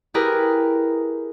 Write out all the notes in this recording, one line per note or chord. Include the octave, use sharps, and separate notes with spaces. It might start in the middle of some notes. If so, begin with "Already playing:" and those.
E4 G4 G#4 A#4 B4